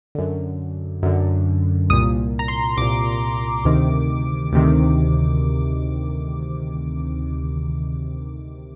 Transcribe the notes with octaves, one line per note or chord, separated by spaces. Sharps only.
F#2 D3
F#2 D3
C2 A#2 D#6
A#5
C6
C2 A#2 D6
D2 C3 D#3
D2 C3 D#3